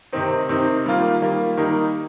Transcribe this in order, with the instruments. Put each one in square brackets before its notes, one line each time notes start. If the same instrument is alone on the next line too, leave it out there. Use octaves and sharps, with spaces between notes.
[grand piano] C3 D#3 C4 D#4
C3 D#3 C4 D#4
D#3 G3 A#3 F4
D#3 G3 A#3 F4
D#3 G3 A#3 D#4 A#4